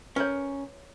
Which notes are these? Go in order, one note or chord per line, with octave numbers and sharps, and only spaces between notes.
C#4 A#4 B4 C#5